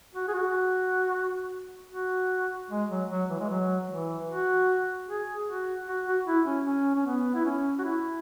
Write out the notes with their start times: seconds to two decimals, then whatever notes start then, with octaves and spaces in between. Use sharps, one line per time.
0.14 F#4
0.28 G#4
0.33 F#4
1.91 F#4
2.70 G#3
2.90 F#3
3.10 F#3
3.30 E3
3.39 G#3
3.49 F#3
3.89 E3
4.28 F#4
5.08 G#4
5.46 F#4
5.87 F#4
6.07 F#4
6.26 E4
6.46 C#4
6.65 C#4
6.95 C#4
7.06 B3
7.34 E4
7.45 C#4
7.79 F#4
7.84 E4